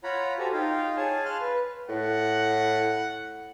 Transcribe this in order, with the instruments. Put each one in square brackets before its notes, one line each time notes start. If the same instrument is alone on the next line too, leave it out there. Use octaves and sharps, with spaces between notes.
[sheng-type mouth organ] F4 C#5 F#5 A#5 B5
F#4 G4 A4 C5 G#5 A#5
D#4 F4 F5 G5
G#4 C#5 G#5 A5
F5 A5 C6 F6 F#6
B4
[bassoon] A2 [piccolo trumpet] F#5